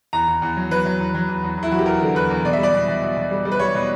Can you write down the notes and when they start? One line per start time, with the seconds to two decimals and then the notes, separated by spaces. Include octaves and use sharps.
0.13 E2 A#5
0.28 E2
0.42 E2
0.57 F#3
0.71 F#3 B4
0.85 F#3
0.99 E2
1.14 F#3
1.28 E2
1.43 E2
1.57 E2
1.63 E4
1.72 F#3 F#4
1.79 G4
1.86 E2 A#4
2.01 D3
2.15 E2 B4
2.30 E2
2.45 B2 D5
2.53 E5
2.58 G3
2.63 D5
2.74 B2
2.88 B2
3.02 B2
3.16 B2
3.31 G3
3.45 G3
3.52 B4
3.60 G3 C#5
3.75 B2